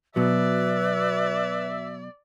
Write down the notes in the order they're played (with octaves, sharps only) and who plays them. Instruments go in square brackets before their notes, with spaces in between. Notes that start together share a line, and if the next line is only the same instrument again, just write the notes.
[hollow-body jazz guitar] B2 F#3 [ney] B4 [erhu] D5 [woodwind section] E5